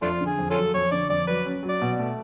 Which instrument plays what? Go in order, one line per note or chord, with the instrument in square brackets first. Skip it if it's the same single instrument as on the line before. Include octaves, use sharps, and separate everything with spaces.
[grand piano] F2 [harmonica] A3 D4 F4
[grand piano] D3
[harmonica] G#4
[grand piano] F2
[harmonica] C#4 F4 A4
[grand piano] F#3
[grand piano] F2 [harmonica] C#5
[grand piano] D3 [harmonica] D5
[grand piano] F2 [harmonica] D5
[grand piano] F#3 [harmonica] B4
[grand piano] C#4
F#3
[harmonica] D5
[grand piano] B2
A3